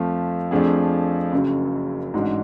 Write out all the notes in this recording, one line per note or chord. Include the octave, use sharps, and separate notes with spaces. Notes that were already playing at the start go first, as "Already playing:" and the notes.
Already playing: F2 F3 A3
F2 F3 A3 D4 G#4
F#1 F#2 C#3 F#3
A1 G#2 G#3 D4 F#4